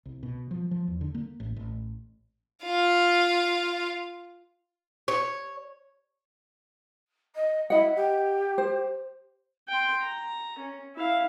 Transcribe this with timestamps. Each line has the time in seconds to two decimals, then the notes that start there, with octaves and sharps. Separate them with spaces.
0.05 C2
0.23 B2
0.51 F3
0.71 F3
0.87 E2
1.01 D3
1.14 A#3
1.40 A1
1.56 A1
2.63 F4 F5
5.08 C#5
7.35 D#5
7.70 E4 D#5 F#5
7.95 G4
8.58 C5
9.69 G5 C6
10.02 A#5
10.58 C#4
10.96 E4 F5